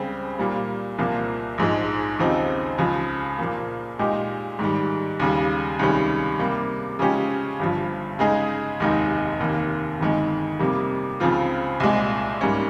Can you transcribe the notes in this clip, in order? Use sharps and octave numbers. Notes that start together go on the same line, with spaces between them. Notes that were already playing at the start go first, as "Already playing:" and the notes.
Already playing: C#2 C#3 G3 C4 G4
A#2 G3 A#3
C2 A#2 F3 A#3
A#1 G#2 F3 G#3
D#2 C#3 F3 C4 D#4
C#2 C#3 F3
A#2 F3 A#3
A#2 G#3 D#4 G4
G#2 D#3 G3
D#2 C#3 G3
C#2 C3 D#3 G3 C#4
C3 G3 A#3
C#3 F3 G#3 C#4 G4
G1 G2 F3
C#3 G#3 D#4 G#4
F1 D#2 D#3 G#3 D#4
F1 D#2 D#3 A#3
G1 F2 D#3 G#3
F2 C3 G3 A#3
C#2 C#3 F3 C4 F4
C2 A#2 G#3
G#2 G3 A#3 C#4